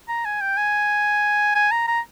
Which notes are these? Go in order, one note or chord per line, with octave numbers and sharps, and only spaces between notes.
A#5
G#5
G5
G#5
G#5
A#5
A#5